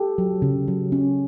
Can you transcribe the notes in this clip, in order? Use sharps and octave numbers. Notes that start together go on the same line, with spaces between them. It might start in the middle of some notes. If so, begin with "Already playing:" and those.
Already playing: G4 A4
F#3
C#3
F#3
C#4